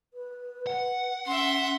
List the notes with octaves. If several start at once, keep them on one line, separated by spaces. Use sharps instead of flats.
B4
F#5
C#4 E5 C6